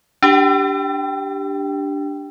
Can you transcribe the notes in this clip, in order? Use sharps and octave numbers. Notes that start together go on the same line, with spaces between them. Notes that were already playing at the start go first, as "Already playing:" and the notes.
D4 G4 G5